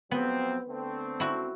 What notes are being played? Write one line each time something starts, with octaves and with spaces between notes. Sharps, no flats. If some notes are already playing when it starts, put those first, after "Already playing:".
F2 F#3 B3 C4
D3 A3 C4
E4 F#4